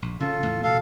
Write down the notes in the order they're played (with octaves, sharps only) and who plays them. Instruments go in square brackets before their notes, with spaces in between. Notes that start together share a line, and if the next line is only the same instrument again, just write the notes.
[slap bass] A#1
[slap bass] C#3 C#4 [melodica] F4 A4
[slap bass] E2 A2
[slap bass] B2 [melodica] A4 F5